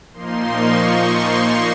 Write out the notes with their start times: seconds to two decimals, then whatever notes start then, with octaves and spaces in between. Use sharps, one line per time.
0.13 A#2 F3 A#3 D#4 C6
0.48 C#6
0.83 C6
1.18 C6